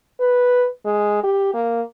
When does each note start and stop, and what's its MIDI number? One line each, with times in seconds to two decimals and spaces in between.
0.20 0.66 71
0.85 1.21 56
1.23 1.50 67
1.54 1.81 58